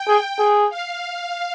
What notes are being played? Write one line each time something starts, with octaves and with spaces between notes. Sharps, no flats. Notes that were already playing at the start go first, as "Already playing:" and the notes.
Already playing: G5
G#4
G#4
F5